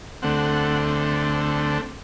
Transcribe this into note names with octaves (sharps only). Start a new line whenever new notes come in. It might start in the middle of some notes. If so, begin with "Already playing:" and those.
D2 D3 A3 C4 F#5